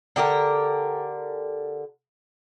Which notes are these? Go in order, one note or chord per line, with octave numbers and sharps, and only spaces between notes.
D3 G4 A4 A#4